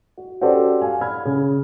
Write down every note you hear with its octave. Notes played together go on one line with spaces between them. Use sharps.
F#4
C#4 F#4 G4 A4 C5 D5
F5 G#5
B5 F6 G#6
C#3